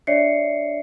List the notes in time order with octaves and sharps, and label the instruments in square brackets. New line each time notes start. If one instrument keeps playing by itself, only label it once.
[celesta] D4 C#5 D5 E5 C7 C#7